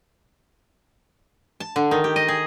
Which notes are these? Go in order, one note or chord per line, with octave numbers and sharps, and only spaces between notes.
A5
D3
D#3
G4
D#5
G#4